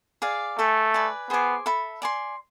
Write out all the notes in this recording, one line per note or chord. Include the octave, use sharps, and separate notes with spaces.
G#4 D5 F5
A3 A4 E5 G#5
B4 D5 G#5
B3 G#4 C5 G#5 D6
A4 E5 B5
D5 G#5 C6